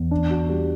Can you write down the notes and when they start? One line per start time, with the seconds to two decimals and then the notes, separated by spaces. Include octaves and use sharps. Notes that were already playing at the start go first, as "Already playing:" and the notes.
Already playing: E2
0.11 D4
0.30 F#4
0.49 G3